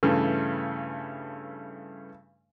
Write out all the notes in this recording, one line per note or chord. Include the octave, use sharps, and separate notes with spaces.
G2 C#3 E3 A3